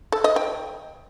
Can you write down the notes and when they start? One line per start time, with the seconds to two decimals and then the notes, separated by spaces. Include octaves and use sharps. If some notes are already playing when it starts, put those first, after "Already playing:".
0.12 A4
0.24 D#5
0.36 G5